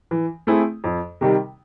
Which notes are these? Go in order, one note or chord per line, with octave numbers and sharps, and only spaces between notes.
E3
A3 C4 E4 G#4
F2
C3 D#3 G3